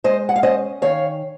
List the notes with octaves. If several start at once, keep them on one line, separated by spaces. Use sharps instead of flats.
G#3 C5 D#5
F#5
F5
C#4 C5 D#5
D#3 C#5 F5